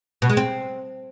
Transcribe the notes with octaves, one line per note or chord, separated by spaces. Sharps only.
B2
G#3
C4